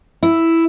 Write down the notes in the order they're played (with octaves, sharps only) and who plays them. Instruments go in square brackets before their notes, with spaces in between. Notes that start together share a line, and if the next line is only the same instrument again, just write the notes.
[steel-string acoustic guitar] E4